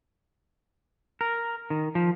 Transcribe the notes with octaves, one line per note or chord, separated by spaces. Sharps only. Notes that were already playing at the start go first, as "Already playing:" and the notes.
A#4
D#3
F3